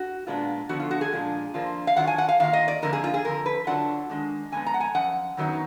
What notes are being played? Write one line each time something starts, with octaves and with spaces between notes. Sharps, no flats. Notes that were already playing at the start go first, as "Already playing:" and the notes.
Already playing: F#4
A#2 G#3 B3 D4 F4
D3 F3 B3 F#4
F4
F#4
G#4
A#2 F3 G#3 D4 F4
F2 F3 A#3 D4 F4
F5
D#3 F#3 D4 F4 F#5
G#5
F#5
F5
D#3 A#3 F4 F5
D#5
D5
F2 D3 F3 A#3 A#4
G#4
F4
G#4
F2 D3 F3 A#4
B4
D3 F#3 D4 F4 F#5
D#3 G#3 D4
F2 D3 G#3 B3 G#5
A#5
F#5
G#5
F#2 F3 F#5
F#2 D#3 F#3 B3 D#4